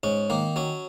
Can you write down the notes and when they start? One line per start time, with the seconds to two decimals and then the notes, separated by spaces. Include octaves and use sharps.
0.03 G#2 C#4
0.30 D#3 A#3
0.56 F#3 C#4